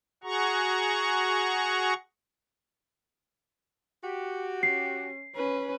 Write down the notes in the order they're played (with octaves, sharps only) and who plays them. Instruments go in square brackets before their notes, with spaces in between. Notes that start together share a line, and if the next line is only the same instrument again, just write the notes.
[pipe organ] F#4 G#4 F#5 A#5 C#6
[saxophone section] F#4 G4
[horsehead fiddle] C#4 [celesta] C7
[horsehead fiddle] C#4 B4